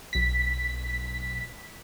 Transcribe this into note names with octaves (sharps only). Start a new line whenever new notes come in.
B1 B6